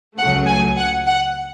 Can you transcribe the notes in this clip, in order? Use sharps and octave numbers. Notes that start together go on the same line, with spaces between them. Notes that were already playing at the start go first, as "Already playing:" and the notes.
C#2 C#3 F#3 A3 F#5
G#5
F#5
F#5